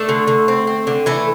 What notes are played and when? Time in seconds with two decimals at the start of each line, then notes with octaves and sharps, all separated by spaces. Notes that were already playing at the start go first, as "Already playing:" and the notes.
Already playing: A3 D4 A4
0.09 D3
0.27 D3
0.48 C4
0.67 C4
0.87 D3
1.06 E3 A3 A4